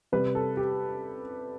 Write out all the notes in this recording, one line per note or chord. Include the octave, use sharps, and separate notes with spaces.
C3 G3 B4
A4
G4